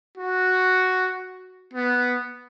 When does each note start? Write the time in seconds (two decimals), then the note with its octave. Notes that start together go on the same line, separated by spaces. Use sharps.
0.17 F#4
1.73 B3